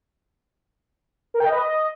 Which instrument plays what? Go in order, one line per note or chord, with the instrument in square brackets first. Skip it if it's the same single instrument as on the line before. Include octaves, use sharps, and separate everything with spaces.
[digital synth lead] A#4
G5
D#5
B4
D#5